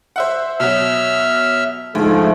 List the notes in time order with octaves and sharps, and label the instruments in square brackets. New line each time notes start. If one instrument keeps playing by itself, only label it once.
[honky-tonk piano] C5 E5 F#5
[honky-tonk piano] B2 F#3 [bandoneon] E5 E6 F6
[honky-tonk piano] D2 [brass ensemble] G#2 F3 A3